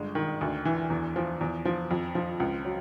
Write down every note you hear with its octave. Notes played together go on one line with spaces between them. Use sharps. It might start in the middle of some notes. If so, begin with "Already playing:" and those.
Already playing: G1 G#3
D#3
D2
E3
E2
F3
E2
F3
F2
F3
C#2
F#3